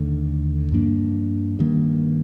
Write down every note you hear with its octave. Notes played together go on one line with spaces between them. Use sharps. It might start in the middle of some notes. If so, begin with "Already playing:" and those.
Already playing: D#2 D3 A3
G2 F3 A#3 D4
G2 D#3 A#3